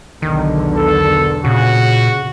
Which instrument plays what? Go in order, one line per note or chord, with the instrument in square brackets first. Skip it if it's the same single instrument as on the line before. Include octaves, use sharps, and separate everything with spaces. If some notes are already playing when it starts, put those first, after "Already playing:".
[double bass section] B1 E2 D3 [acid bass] D#3
[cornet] A4
[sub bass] A#2 [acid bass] C#3 [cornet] F#4